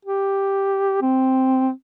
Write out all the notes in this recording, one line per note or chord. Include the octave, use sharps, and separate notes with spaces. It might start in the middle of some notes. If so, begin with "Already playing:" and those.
G4
C4